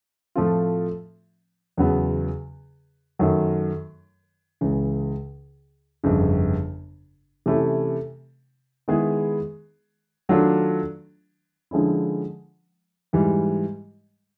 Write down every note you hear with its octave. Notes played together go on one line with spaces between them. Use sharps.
A2 F3 A3 C4 F4
E2 C#3 F#3 B3
F#2 D#3 F#3 A3
C#2 C#3 E3
G1 F2 C#3
C3 E3 A3 C#4 E4
D#3 G#3 B3 E4 G#4
D#3 F#3 A3 D4 F4
D3 F3 G#3 C#4 E4
G#2 E3 G3